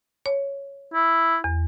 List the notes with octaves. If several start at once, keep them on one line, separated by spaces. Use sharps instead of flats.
C#5
E4
E2